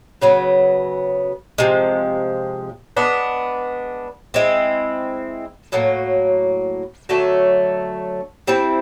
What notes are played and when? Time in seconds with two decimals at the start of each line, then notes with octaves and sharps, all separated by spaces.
0.22 C#3 F#3 B3
1.58 C3 F3 G#3
2.97 G#3 B3 D4
4.34 G#3 C4 E4
5.72 A2 F#3 A#3
7.09 D3 F#3 A3
8.47 G3 C4 E4